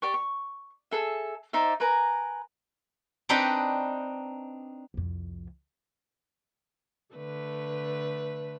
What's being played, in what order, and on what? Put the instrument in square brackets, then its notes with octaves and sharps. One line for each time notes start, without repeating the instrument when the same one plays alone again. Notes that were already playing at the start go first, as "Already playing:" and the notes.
[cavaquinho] G4 D5 C#6
C#6
G#4 A4 E5
D#4 C5 D5 E5
A#4 B4 G#5 A#5
[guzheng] C4 D4 D#4 B4 D#5 G5
[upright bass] C2 F2
[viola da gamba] D3 A3 B4